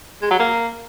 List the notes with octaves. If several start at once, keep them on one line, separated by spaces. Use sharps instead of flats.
G#3
F#3
A#3